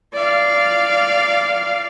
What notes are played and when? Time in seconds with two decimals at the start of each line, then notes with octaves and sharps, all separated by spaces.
0.13 D5 F5